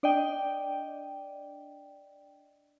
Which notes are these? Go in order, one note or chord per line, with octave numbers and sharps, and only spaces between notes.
D4 D5 D#5 G5